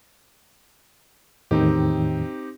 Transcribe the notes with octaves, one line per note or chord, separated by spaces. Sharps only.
E2 A2 D#3 C4 D#4 G4